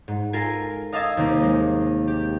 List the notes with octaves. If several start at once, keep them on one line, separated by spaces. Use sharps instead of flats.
G#2
F4 A4 A#4 G#5 C7
D#5 F5 A5 D#6 E6 G#6
D#2 C3 A#3
G#3
G4